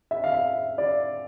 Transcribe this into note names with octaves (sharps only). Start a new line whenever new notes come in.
E5
F5
E5
D5